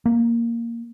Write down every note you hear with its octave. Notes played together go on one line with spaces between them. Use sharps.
A#3